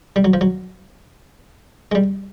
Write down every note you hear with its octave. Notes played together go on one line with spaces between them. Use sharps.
G3
F#3
F3
F#3
G#3
G3